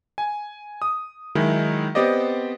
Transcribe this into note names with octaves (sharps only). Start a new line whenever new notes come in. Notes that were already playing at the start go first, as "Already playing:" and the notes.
G#5
D#6
D#3 F#3 G#3 D#4 E4
B3 C4 G4 C5 D5 D#5